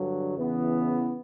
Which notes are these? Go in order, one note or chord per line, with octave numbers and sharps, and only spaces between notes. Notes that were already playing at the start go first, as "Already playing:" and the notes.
Already playing: G2 D3 F#3
E2 C#3 E3 B3